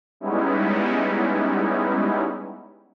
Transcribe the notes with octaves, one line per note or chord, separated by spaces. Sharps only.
G3 G#3 B3 C#4 D#4 E4